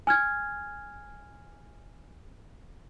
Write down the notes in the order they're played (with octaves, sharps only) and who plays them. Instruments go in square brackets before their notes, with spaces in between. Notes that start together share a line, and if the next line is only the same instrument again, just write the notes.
[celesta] G#5 F6 G#6